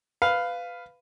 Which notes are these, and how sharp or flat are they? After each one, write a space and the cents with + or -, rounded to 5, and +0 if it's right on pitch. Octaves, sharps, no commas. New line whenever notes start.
B4 +15 F5 +0